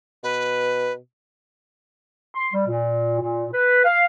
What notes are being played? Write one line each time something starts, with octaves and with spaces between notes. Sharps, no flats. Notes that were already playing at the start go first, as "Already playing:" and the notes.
B2 B4
C6
G3
A#2
A#2
B4
F5